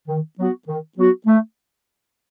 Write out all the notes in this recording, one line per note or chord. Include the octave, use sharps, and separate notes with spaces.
D#3
F#3 B3 F#4
D#3
F#3 B3 F#4
A3